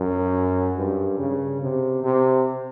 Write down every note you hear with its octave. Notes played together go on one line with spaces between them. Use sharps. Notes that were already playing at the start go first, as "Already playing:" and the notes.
Already playing: F#2
G2
C#3
C3
C3